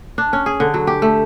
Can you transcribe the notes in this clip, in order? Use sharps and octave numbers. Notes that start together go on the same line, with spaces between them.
D4
C#4
G#4
D3
F#3
G4
A3